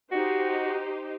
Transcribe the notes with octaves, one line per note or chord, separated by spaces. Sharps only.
D#4 F#4 G4 C5